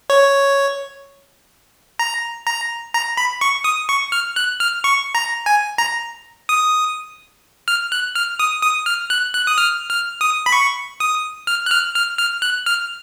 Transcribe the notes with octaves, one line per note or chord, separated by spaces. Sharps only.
C#5
A#5
A#5
A#5
B5
C#6
D#6
C#6
F6
F#6
F6
C#6
A#5
G#5
A#5
D#6
F6
F#6
F6
D#6
D#6
F6
F#6
F#6
D#6
F6
F6
D#6
B5
C#6
D#6
F6
F#6
F6
F6
F6
F#6
F6